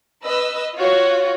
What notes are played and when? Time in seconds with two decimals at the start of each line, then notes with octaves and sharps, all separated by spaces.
0.24 B4 D#5 E6
0.76 F4 F#4 C#5